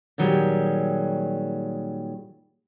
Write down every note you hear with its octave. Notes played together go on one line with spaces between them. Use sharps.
A#2 D#3 F#3 G3 G#4